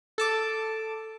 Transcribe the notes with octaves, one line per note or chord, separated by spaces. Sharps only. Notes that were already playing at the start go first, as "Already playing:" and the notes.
A4 A5 D6